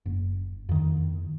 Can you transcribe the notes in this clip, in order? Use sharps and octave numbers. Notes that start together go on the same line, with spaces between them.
F#1
F2 D#3